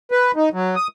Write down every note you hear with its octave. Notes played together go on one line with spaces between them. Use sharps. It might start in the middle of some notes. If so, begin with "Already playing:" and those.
B4
D#4
F#3
D#6